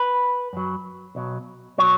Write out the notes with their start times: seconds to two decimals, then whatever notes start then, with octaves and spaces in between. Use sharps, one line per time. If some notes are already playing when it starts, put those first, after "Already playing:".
Already playing: B4
0.53 F#2 F#3
1.15 B1 B2 F#3
1.78 B2 F#3 C#5